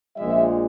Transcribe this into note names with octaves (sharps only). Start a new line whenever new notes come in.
A#1 A#2 F3 G#3 E5